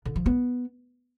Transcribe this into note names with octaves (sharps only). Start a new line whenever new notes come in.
D3
F3
B3